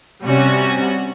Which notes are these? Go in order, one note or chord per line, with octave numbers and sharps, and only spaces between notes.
C3 G3 C#4 F#4